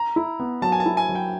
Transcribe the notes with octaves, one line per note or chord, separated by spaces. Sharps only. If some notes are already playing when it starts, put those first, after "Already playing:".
Already playing: A#5
E4
B3
F#3 A5
G#5
A5
E4
G#5
F#3
G5